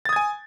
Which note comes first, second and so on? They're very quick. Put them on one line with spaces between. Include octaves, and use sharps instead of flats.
A6 D#6 G#6 G#5